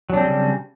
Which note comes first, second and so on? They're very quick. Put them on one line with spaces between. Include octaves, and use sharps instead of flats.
F#3 D4 C4 G3 C#3